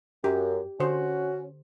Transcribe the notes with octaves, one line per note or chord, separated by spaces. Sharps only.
F#2 G4
D3 C#4 F#4 C5